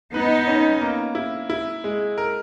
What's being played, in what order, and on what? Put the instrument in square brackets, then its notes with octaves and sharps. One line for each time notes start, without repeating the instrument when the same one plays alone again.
[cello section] B3 D#4 [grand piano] B4
[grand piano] C#4
A#3
E4
E4
G#3
A#4